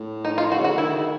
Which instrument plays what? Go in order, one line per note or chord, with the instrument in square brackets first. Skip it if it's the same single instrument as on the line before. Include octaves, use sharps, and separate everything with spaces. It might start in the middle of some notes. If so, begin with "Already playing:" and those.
Already playing: [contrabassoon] A2
[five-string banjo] D#4
F4
F#4
[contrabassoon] C#3
[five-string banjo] F#4
[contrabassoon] D3
[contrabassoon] D#3 [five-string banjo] E4